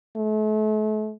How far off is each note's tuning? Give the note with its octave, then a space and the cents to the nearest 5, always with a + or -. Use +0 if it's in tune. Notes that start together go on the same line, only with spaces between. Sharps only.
A3 -40